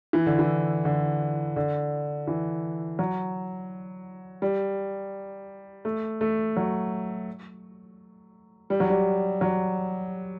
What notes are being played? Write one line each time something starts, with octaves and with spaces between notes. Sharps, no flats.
E3
D3
E3
D3
D3
E3
F#3
G3
A3
A3
F#3
G3
F#3
G3
F#3